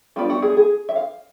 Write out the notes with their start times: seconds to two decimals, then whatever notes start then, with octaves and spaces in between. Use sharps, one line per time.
0.16 G3 B3 D4 F4
0.30 F#4
0.42 G#4
0.57 G#4
0.89 E5
0.96 F5